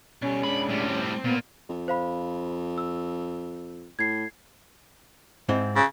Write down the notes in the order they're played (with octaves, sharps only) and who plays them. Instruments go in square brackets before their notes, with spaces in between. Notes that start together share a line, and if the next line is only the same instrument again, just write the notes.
[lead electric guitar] B2 G3 [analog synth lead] C#4
[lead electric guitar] G#3 D4 [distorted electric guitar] B5
[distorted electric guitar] A2 G3
[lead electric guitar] C4
[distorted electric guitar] A#2 A#3 [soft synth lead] B3
[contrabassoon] F2
[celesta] C5 F5 B5
E6
[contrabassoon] A2 [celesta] G#6 C7
[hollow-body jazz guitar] G#2 C4 E4
[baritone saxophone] C#3